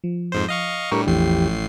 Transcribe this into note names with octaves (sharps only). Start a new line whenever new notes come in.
F3
F2 G#2 C5
D#5 F5 C#6
A2 G3 D4 G4 A#4 C#6
A1 E2 A2 F3 G4 C7